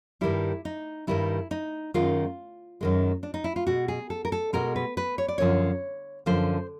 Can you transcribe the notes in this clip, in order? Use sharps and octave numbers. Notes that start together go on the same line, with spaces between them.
G2 D#3 G3 E4
D#4
G2 D#3 G3 E4
D#4
F#2 D#3 G#3 F4
F#2 D#3 G#3
D4
D#4
E4
F4
B2 G#3 F#4
G#4
A4
A#4
A4
B2 G#3 A#4
B4
B4
C#5
D5
F#2 D3 F3 C#5
F#2 D3 F3 C5